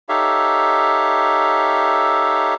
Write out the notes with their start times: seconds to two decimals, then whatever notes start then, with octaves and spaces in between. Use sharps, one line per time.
0.09 D#4 G4 A4 C#5 E5 F5